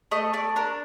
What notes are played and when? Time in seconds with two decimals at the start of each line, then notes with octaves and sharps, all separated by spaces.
0.11 A3 D#5
0.33 A3 D5
0.56 D4 A#4